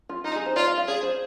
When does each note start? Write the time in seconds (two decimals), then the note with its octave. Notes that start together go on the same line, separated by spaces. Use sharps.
0.09 F4
0.24 D#4 F4
0.36 G#4
0.46 C5
0.56 F4 D5
0.67 F5
0.78 F5
0.88 G#4 D5
1.03 C5